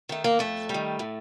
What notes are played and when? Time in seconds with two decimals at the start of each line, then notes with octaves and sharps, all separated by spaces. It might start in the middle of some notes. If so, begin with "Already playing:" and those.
0.09 D#3 A3
0.24 A#3
0.39 F2 A3
0.69 G3
0.74 D#3
0.99 A2